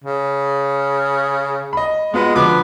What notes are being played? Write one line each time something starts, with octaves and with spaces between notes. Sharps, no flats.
C#3
D#5 B5
G#3 B3 F4 B4
D3 F3 B3 D6